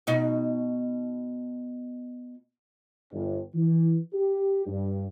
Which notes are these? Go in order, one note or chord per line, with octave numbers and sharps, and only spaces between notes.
B2 D#4 F#4
G1
E3
G4
G2